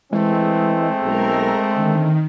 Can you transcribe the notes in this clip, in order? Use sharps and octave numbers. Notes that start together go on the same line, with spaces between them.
E3 G#3 A3 C4
B1 A#4 A#5
D3 D#3